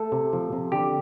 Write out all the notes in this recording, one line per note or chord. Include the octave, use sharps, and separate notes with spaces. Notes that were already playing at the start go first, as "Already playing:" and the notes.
Already playing: A3 A4
C3
F3
C3
D3 G4